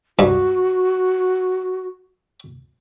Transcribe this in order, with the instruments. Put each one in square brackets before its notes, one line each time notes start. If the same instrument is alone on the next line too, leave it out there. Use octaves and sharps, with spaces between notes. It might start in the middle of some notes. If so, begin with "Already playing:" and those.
[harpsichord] G2 [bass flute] F#4